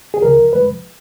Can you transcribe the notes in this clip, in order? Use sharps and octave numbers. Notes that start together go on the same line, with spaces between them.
G#4
C#2 C#3 F3 A#4
F2 F3 G#3 B4